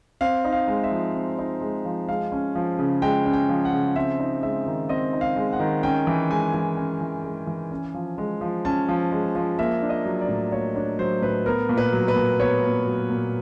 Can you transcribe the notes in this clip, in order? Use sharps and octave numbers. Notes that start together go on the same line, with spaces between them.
C4 F5
D#4
F5
G#3
E5
F3
C4
D#4
G#3
F3
G#3 F5
C#4
F3
C#3
G#3 G5
C#4
G5
F3
F#5
C#3
C4 E5
D#4
G#3 E5
D#3
C4 D#5
D#4
F5
G#3
F#5
D#3
C#4 G5
E3
G#3 G#5
E3
C#4
E3
G#3
E3
C#4
F3
G#3
F3
C#4 A5
F3
G#3
F3
A#3 E5
D4
D#5
F#3
D5
A2
A#3 C#5
D4 C#5
F#3 C5
A2 B4
B3 A#4
A#2
B4
F#3
B4
A#2
B3 C#5
A#2
F#3
A#2